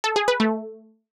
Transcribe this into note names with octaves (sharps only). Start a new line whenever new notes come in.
A4
G#4
B4
A3